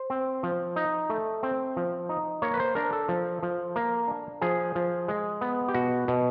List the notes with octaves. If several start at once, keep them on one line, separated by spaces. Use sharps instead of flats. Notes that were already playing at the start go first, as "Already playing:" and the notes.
Already playing: C5
C4
F3
D#4
A3
C4
F3
D#4
A#3 C#5
B4
C5
D4 A#4
A4
F3
F3
A#3
D4
F3 G#4
F3
G#3
B3
G4
B2 F#4
B2